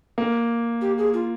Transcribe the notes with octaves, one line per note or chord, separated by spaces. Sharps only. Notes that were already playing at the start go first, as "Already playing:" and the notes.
A#3
G4
G#4
F4